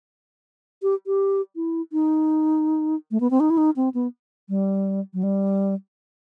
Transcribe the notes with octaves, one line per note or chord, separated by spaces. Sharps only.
G4
G4
E4
D#4
A3
B3
C4
D#4
E4
D#4
C4
B3
G3
F#3
G3